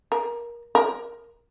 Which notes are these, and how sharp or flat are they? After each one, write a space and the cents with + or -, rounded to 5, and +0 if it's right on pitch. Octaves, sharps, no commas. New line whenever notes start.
A#4 +20
A#4 +10